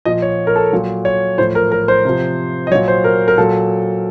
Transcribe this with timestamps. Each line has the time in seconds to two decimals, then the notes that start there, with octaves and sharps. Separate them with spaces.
0.05 A#2 F3 D#5
0.22 C#5
0.47 A#4
0.56 A4
0.73 A#2 F#3
1.05 C#5
1.38 A2 F3 C5
1.55 A#4
1.72 A#4
1.88 C5
2.05 C3 F3
2.67 D#5
2.71 F#3 C#5
2.75 A#2
2.88 C5
3.04 A#4
3.28 A#4
3.38 A#2 F#3 A4